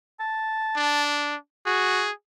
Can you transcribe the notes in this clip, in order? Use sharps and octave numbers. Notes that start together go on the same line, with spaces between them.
A5
D4
F#4 G#4